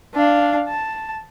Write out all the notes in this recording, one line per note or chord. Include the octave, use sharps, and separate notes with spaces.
D4 F5
A5